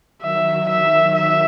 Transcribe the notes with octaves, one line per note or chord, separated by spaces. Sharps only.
D#3 F#3 E5
D#3 F#3 E5
D#3 F#3 E5